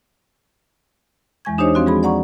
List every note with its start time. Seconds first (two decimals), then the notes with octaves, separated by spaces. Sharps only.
1.45 E2 E3 G#3 G#5 C#6 G#6
1.58 D4 D#4 G4 C5 C#5 D#5
1.74 F3 C4 F#4 D#5
1.87 G#3 G#4 B5
2.03 D5 F#5 A#5 C#6